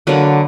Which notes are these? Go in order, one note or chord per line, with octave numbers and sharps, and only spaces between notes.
D3 F#3 A#3 B4